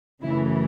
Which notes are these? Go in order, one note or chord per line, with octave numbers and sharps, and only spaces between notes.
F#2 C#3 E3 A3 E4